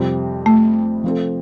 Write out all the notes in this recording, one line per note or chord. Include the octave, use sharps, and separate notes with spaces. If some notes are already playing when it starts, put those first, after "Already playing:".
Already playing: F2 C3 G3 C4
A3
F3 C4 A4